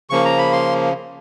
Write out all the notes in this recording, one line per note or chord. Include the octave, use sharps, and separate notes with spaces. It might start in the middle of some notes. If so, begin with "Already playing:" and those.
C#3 F3 A#3 C#6
A#5
B5
C6